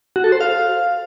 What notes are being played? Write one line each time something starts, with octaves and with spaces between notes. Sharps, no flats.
F#4
A4
C5
F5